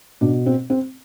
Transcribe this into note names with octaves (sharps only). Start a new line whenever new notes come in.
B2 D4
C4
C4